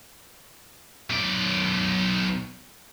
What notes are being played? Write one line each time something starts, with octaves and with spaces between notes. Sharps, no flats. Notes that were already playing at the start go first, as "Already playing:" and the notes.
B1 D5